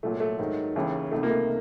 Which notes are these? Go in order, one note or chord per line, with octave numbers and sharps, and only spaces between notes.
C2 A#2 F#3 A3
A3
G#2 D#3 F#3
D#2 C#3 E3
C#2 C3 D#3 A3
A#3
A3